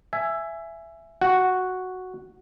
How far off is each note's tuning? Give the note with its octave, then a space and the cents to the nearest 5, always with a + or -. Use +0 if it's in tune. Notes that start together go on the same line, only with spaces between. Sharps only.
E5 +15 G#5 +0
F#4 +0 F#5 +0